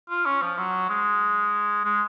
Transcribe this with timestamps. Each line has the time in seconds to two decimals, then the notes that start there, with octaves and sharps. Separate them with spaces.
0.09 F4
0.26 C#4
0.42 F3
0.58 F#3
0.89 G#3
1.85 G#3